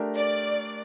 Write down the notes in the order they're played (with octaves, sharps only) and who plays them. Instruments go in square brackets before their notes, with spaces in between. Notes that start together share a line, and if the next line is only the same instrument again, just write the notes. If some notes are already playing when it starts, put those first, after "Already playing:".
Already playing: [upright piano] A3 D4 G4 A#4
[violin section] D5